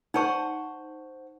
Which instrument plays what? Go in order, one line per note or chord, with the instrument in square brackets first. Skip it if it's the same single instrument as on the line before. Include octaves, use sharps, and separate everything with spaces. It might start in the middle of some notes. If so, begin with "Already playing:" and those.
[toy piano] D#4 A5 C#6 [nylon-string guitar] C5 F#5